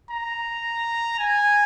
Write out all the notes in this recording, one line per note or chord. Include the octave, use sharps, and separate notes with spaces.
A#5
G#5